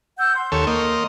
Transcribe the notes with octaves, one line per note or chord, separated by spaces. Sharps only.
F#5 E6 G6
C6
D#2 A4 C#5
A#3 D#5